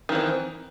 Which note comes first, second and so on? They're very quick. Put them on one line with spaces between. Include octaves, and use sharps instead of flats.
D#3 E3 C4